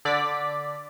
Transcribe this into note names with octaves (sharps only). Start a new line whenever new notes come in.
D3 D5 B6